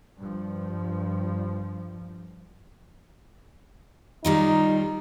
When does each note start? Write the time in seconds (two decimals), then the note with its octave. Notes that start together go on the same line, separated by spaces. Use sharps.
0.19 G2 F3
4.25 D#3 G3 D#4 F4